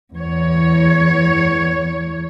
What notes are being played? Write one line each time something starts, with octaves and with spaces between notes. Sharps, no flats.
E2 C#5